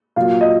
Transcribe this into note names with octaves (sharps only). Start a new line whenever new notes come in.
A#2 F#3 F4 F5
D#5